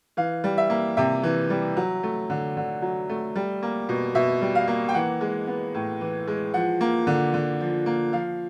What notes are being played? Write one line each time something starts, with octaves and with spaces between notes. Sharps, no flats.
E3 F5
G3
E5
A#3
C3 E5
E3
G3
F#3
A3
D3
D3
F#3
A3
G3
A#3
B2
B2 E5
G3
F5
A#3
G5
E3 F#5
G#3
B3
A2
E3
G#3
F3 F#5
A#3
D3
D3
F3
A#3
F3 F5